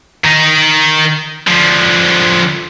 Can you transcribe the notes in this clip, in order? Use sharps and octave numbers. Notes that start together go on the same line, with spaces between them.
D#3 D#4
D3 F3